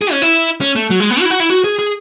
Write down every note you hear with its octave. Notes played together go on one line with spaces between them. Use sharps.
G#4
C#4
E4
C#4
A3
F#3
G#3
B3
F#4
E4
F#4
E4
F#4
G#4
G#4